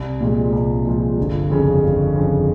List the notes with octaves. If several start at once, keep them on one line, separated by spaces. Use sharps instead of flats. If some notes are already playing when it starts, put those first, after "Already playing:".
Already playing: C2
A#2 F3 G#3
C2
A#2 F3 G#3
G1
F2 C#3
G1
F2 C#3